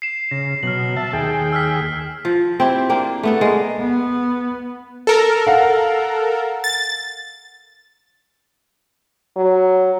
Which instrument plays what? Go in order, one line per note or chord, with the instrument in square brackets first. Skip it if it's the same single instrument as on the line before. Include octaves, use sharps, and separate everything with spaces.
[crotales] C7 E7
[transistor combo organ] C#3 [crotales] A#6
[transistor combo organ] B2 F#3 [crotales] F6 F#7
[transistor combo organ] E5 A5
D#2 G#4 G5
[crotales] E6 F6 B6
[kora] F3
C4 E4 G4
A#3 C4 D4
A3 B3 A4
G#3 A#3
[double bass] B3
[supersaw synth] A4 A#4
[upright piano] F5 F#5
[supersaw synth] A6
[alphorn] F#3